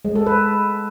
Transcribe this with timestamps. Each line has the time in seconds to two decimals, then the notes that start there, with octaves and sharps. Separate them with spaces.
0.05 G#3
0.16 A4
0.26 B4